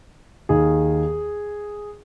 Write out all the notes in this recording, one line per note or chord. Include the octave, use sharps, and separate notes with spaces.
D#2 D#3 G#4